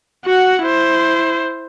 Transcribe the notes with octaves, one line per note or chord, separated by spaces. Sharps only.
F#4 F#5
E4 C5